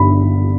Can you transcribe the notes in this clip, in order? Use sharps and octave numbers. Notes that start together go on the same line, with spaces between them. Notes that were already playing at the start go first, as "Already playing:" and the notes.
Already playing: G1 G2 D3 B5